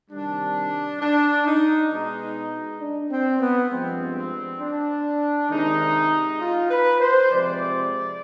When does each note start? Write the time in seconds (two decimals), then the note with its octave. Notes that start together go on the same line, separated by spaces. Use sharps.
0.10 C3 D#3 G3 D4
1.01 D4
1.46 D#4
1.90 B2 G#3 D#4
2.80 D4
3.10 C4
3.40 B3
3.70 G2 F3 G#3 C4
4.15 C4
4.60 D4
5.50 C3 D#3 G#3 D#4
6.40 F4
6.70 B4
7.00 C5
7.30 C3 F3 G#3 D5